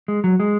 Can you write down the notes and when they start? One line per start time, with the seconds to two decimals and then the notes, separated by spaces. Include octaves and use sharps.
0.08 G#3
0.24 F#3
0.40 G#3